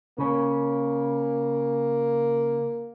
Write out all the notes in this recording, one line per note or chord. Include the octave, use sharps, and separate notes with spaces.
C#3 A#3 C#4